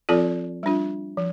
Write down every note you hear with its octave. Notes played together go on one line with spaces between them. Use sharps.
F3 C4 F4 A4 D5
G3 D4 F4
F3